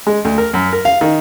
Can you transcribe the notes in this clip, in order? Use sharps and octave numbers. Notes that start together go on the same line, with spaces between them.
G#3
D2
A#4
F#2
A#4
F5
D#3